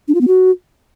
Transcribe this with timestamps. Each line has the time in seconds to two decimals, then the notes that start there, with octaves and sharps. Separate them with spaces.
0.08 D4
0.15 F4
0.21 B3
0.28 F#4